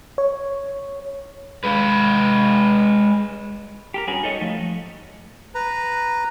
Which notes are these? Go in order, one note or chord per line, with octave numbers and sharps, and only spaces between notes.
C#5
G#3 B4
G4 A4 A#4
G2 C#4 F#4 G#4 B4
D#4 A4 C#5 D#5
F3 A3
B4 A#5